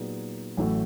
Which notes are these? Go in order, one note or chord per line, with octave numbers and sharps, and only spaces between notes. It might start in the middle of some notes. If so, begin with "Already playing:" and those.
Already playing: A#2 F#3 B3 D#4 G#4
A1 A2 F#3 A3